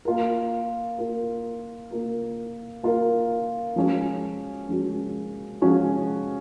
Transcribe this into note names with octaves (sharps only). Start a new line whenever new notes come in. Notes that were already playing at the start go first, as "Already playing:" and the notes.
A#3 F4 A#4
A#3 F4 A#4
A#3 F4 A#4
A#3 F4 A#4
F3 G#3 C#4 F#4
F3 G#3 C#4 F#4
F3 G#3 C#4 F#4